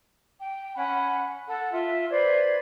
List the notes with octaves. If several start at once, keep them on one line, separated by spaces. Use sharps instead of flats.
G5
C#4 F#5 B5
A4 F#5
F4 E5
B4 C5 D5 G#6